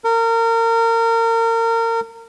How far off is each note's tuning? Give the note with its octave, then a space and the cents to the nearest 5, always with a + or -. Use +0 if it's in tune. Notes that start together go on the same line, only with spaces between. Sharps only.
A#4 -30